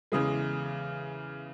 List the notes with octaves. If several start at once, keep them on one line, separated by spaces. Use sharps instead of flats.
E2 C#3 E3 G#3 D#6